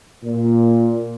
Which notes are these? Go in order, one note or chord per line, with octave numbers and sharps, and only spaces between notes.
A#2